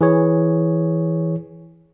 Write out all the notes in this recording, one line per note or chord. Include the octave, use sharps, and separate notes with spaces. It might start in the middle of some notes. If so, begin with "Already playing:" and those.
E3 G#4 C#5